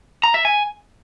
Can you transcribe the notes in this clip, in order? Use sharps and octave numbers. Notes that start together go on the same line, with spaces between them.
A#5
E5
G#5